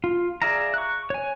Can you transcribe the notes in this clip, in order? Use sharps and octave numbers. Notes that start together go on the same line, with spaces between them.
F4
G#4 D5 E5 F5 A#5
C#6 F#6
C#5 G#5